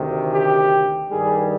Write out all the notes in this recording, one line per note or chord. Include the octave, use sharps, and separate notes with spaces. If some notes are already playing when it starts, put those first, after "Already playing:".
Already playing: D2 C3 D#3
G4
G2 D#3 G3 G#4